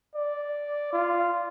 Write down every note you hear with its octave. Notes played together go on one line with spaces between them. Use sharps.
D5
F4